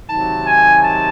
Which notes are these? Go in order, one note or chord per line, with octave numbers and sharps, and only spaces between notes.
C3 D#3 F#3 A5
G#5
A5